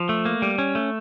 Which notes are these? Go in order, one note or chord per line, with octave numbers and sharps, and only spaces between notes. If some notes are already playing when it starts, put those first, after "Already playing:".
Already playing: F3
A3
A#3
G3
C#4
A3